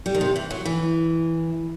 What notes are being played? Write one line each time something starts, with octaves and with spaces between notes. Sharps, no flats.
G3
D#3
C3
E3
F#3
E3